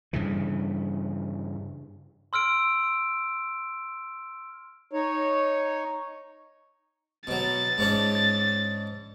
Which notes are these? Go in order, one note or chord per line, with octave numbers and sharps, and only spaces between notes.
G2 C#3 E3
C6 E6 F6 D7
D#4 C#5
B2 F#3 A6
G#2 C#4 D4